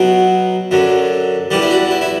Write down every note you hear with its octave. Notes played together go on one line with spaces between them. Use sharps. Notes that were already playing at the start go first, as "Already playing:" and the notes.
Already playing: B2 F#3
F#2 D3 F#3
E2 D3 G3 G4
E4
F#4
E4
E4